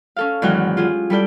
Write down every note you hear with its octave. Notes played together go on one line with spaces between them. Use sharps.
C#4 A4 F5
E2 G#2 D#3 F#3 F#4 G5
F4 G4 G#4
G3 E4 A4 D5 G6